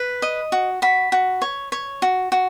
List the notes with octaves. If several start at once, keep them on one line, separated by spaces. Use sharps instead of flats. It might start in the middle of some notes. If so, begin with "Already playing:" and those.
Already playing: B4
D#5
F#4
F#4 B5
F#4
C#5
C#5
F#4
F#4